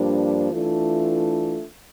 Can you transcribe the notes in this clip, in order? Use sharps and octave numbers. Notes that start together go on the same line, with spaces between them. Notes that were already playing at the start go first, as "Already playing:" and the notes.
Already playing: G2 F3 A#3 D4
E3 A3 D4 F4